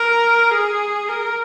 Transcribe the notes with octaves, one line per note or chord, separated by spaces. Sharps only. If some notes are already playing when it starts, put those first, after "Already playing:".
Already playing: A#4
G#4
A#4